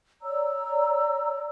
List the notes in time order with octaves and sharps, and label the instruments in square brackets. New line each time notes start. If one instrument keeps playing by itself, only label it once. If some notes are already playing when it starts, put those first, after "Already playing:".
[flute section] C#5 D5 A#5 E6